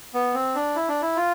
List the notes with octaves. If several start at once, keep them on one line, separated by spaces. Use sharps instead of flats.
B3
C4
D4
E4
D4
E4
F4